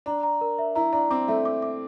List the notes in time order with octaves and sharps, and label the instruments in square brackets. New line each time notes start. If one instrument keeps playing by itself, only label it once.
[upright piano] D4 [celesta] A#5
[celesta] A#5
A#4
E5
[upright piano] E4 [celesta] A#5
[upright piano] D4 [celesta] A#5
[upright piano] C4 [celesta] D6
[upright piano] A3 [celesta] E5
[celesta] D6
D6